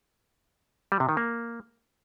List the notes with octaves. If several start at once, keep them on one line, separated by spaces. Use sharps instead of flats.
G3
C3
D#3
A#3